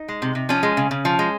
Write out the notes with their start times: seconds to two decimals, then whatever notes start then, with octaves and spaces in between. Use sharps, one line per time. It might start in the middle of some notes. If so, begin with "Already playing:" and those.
Already playing: D#4
0.08 G#3
0.22 C3
0.35 C3
0.49 F3 C#4
0.63 G#3
0.77 C#3
0.91 C#3
1.05 F3
1.19 G#3